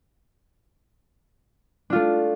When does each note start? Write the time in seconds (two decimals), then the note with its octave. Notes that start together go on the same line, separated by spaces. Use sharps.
1.90 D4
1.93 F4
1.95 A3